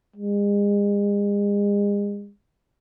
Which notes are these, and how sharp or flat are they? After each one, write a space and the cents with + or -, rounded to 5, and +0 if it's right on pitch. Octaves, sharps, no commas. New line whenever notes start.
G#3 -40